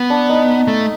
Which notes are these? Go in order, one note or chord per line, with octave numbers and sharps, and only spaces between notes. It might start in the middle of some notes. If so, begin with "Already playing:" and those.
Already playing: B3
D4
D#4
A3